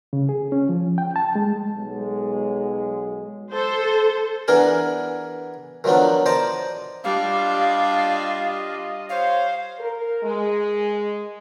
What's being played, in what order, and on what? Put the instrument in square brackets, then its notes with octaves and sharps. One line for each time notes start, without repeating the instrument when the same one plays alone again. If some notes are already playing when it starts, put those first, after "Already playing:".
[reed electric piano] C#3
G#4
C#4
F3
G5
A5
G#3
[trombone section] B1 F#3 G#3
[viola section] A4 C5
[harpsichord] E3 B3 D4 G#4 A#4
D#3 F3 F#3 B3 D4
C5 D5 D#5 A5 A#5
[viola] G3 D4 [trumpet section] F4 D#5 [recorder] F5
[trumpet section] C5 C#5 [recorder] F5
[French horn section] A#4
G#3